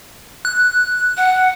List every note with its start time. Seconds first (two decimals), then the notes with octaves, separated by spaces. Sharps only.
0.45 F#6
1.17 F#5